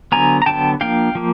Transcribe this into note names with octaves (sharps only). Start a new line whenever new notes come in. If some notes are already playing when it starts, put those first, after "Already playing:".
D3 F#3 B3 G#5 A#5
A#5
D3 F#3 B3 G5 A5
F3 A#3 D4 F5 G5
F3 A#3